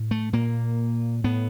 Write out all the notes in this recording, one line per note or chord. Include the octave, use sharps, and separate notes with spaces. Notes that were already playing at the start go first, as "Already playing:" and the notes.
Already playing: A2
A3
A#2 A#3
A2 B3